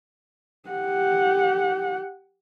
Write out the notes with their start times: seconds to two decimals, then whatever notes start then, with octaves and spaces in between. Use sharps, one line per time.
0.69 G4 F#5